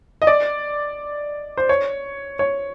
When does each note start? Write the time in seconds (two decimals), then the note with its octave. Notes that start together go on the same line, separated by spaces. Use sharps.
0.22 D#5
0.27 D5
1.57 C5
1.69 C#5
2.39 C#5